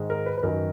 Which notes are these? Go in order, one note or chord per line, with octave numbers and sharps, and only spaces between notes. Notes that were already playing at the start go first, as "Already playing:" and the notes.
Already playing: G#2 D#3 G#3
A#4
B4
B4
F#2 D#3 F#3 A#4